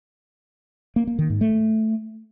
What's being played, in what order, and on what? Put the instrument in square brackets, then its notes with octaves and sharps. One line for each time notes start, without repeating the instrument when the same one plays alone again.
[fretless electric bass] A#3
A#3
D#3
G#2
A3